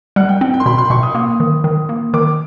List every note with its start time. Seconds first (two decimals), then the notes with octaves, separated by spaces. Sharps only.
0.16 G3 F#5
0.29 G5
0.41 C4
0.54 G5
0.60 C6
0.66 B2 B5
0.78 C6
0.90 B2 C#6
1.03 D#6
1.15 A#3 D#6
1.40 D#3
1.64 D#3
1.89 A#3
2.14 D#3 D6